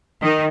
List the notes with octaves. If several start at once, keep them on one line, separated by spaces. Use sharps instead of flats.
D#3